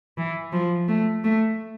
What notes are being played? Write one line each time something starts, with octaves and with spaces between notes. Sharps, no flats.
E3
F3
A3
A3